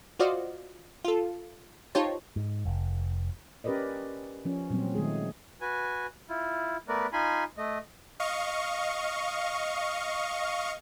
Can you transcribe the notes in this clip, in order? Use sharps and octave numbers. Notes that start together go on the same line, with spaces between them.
F4 F#4 C5 D5 D#5 F5
F4 A4
D#4 F4 G4 C5 C#5 A5
G#2
F1
C#4 G4 A#4 B4 D5 D#5
F3 C#4
A#2 F#3 G3 C4
D#3 G#3 A3 G#4
F#4 B4 G#5
E4 F4
A3 B3 A#4 B4 D5
D#4 F4 G#5 B5 C6
A3 D#5
D#5 F5 C#6